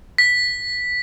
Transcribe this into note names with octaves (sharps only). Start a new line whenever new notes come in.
B6